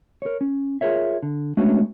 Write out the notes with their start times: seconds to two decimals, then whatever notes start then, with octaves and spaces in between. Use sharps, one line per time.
0.22 A#4 C#5
0.41 C#4
0.81 F4 G#4 A#4 C#5 E5
1.23 D3
1.57 G#3 A3 B3 C#4 D4 F#4